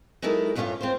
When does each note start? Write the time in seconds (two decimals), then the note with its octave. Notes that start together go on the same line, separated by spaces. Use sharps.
0.22 F#3 G#3 D#4 E4 A4 A#4
0.55 G2 A3 C#4 E4 F4 C#5
0.81 C4 F4 C5